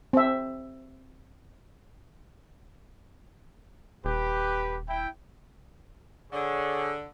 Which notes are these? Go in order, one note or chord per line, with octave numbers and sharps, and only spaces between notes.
C4 E5
D#1 G4 B4
E4 G5
D3 G#4 C#5